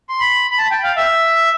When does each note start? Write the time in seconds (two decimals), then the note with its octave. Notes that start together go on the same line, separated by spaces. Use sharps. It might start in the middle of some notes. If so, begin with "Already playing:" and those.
0.09 C6
0.20 B5
0.51 B5
0.58 A5
0.71 G5
0.83 F5
0.96 E5